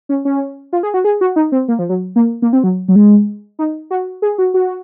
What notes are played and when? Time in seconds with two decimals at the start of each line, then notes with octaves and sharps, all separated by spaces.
0.09 C#4
0.25 C#4
0.73 F4
0.83 G#4
0.94 F#4
1.04 G#4
1.21 F#4
1.36 D#4
1.52 C4
1.68 A#3
1.79 F3
1.89 F#3
2.16 A#3
2.42 A#3
2.53 C4
2.64 F#3
2.88 F#3
2.96 G#3
3.59 D#4
3.91 F#4
4.22 G#4
4.38 F#4
4.54 F#4